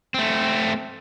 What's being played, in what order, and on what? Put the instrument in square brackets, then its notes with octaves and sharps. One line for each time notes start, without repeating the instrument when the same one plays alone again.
[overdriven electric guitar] A3 C4